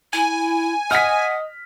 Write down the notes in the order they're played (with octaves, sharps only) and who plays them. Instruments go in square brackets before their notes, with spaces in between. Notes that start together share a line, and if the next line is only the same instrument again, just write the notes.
[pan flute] E4 [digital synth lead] G#5
[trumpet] D#5 [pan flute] F#5 [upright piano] F6 B6